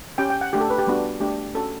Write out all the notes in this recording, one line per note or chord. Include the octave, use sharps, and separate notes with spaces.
C#4 G4 G5
G5
F#5
A3 D4 G4
A4
B4
G4
G3 B3 D4 F#4
A3 D4 G4
C#4 F#4 A4